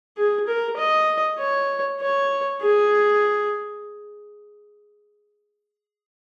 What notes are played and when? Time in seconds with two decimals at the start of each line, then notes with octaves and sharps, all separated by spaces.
0.17 G#4
0.47 A#4
0.77 D#5
1.39 C#5
2.01 C#5
2.62 G#4